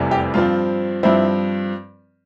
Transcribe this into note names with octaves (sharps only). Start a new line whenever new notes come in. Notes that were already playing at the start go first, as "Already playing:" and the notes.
Already playing: F1 E2 C3 E3 G3
G4
G2 F3 C4 F4
G2 F3 C4 E4